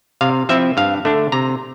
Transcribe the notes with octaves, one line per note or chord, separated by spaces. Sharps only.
C3 F5
F3 C4 E4 E5
G2 F5
D3 A3 D4
C3 A#5